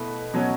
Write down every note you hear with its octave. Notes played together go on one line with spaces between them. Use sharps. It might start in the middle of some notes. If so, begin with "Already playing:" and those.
Already playing: B2 A3 E4 B4
B2 F#3 C#4